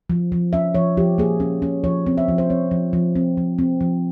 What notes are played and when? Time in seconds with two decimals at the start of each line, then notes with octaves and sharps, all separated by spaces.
0.10 F3
0.32 F3
0.53 C#4 E5
0.74 F3 C#5
0.97 F3 G4
1.18 A#3 G#4
1.40 C#4
1.62 C#4
1.84 F3 C#5
2.06 C4
2.18 E5
2.28 F3
2.38 C5
2.50 C4 C#5
2.71 F3
2.93 F3
3.16 C4
3.37 F3
3.58 C4
3.81 F3